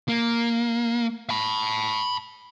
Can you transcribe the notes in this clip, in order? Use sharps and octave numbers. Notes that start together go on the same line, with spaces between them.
A#3
A5 B5